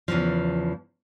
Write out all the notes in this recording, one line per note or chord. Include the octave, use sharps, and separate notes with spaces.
E2 C#3 E3 F3